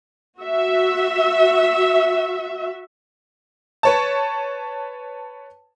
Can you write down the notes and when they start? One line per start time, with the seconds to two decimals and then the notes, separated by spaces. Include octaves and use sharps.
0.40 F#4 E5
3.83 B4 C#5 A5